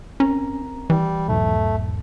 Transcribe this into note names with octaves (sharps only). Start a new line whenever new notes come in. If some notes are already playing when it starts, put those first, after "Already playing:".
C4 C#4 A#4 A#5
E3 G3
B1 E2 G#2 A3